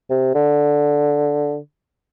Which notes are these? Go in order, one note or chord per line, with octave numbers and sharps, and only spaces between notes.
C3
D3